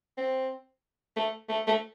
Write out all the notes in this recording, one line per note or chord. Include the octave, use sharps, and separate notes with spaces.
C4
A3
A3
A3